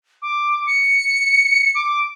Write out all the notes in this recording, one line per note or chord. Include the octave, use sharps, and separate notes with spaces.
D6
C#7
D6